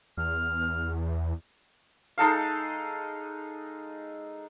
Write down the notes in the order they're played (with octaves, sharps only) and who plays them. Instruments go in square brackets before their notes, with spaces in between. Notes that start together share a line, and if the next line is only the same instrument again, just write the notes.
[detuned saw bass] E2 [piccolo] F6
[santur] G#3 D#4 A4 F5